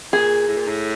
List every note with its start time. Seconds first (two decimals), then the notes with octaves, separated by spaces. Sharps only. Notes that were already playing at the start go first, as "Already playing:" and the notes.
0.13 A#2 G#4
0.48 A2
0.57 A#2
0.68 A2